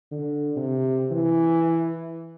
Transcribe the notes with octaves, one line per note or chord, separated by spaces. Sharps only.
D3
C3
E3